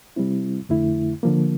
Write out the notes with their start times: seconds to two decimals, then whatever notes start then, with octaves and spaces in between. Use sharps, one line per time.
0.16 C3 G3 C4 E4
0.69 F2 D3 A3 E4
1.23 D3 F3 A#3